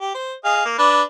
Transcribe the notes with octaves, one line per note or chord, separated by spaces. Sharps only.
G4
C5
G#4 D#5 F5
A#3
D4 B4 D5